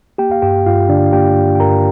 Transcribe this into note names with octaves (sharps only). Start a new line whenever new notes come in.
A#3 G4 G5
F5
G2 G4 G5
G2 F4 F5
D3 D4 D5
F5
A#3 G4 G5
G2
G5
G2 A#4 A#5